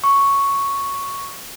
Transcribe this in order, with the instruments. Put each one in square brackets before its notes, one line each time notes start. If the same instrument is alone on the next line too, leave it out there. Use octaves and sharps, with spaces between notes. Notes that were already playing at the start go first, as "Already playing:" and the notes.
[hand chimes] C#6